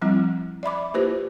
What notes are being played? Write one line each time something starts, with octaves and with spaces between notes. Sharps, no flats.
F3 G3 C4 E4
D5 E5 B5 D6
A#3 E4 F4 G4 B4 C5